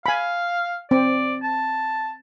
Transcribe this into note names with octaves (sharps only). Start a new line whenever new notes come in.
F5 G#5 B5
C4 D5
A5